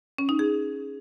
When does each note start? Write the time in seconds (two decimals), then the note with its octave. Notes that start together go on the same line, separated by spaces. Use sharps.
0.18 C#4
0.29 D#4
0.39 G#4